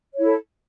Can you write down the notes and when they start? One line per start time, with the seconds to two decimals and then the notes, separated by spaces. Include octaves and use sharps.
0.14 C#5
0.19 E4
0.23 A4